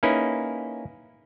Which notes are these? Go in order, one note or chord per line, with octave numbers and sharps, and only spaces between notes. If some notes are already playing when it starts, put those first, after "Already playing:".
A#3 C#4 D#4 E4 G#4 B4